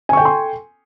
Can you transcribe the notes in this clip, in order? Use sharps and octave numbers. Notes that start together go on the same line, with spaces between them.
A4 G5 G#5 C6 C#6